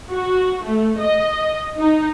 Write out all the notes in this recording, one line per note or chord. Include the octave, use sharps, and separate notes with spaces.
F#4
A3
D#5
D#4